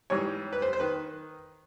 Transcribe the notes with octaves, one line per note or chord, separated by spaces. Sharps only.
G#2 E3 G3 C#5
B4
C5
C5
D#3 B4